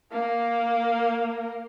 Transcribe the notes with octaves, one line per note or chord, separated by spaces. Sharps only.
A#3 A#4